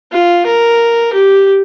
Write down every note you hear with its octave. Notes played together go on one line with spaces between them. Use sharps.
F4
A#4
G4